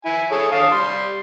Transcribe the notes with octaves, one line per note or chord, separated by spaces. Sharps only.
E4 G#5
G#4 A4 C#5
D4 F5 D#6
G3 C6